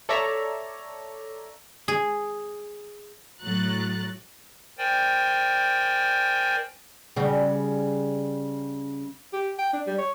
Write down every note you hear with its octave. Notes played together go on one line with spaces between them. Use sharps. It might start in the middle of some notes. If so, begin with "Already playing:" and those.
A4 C#5 D5 E5 A#5
G#4
A2 F#3 A#5 F#6 A6
A#4 C5 D5 G5 G#5
C#3 G3 F#4
G4
G5
D4
G3
C#5